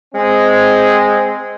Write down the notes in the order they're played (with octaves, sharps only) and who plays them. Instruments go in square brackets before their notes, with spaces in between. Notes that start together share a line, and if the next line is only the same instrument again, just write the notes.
[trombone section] G#3 C4